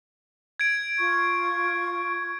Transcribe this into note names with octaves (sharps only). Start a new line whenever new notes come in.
G#6 D7
F4 C#6